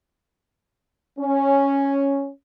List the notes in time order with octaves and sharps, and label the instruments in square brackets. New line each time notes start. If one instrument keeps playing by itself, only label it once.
[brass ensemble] C#4